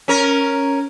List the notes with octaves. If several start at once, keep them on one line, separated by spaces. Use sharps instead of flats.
C#4 A#4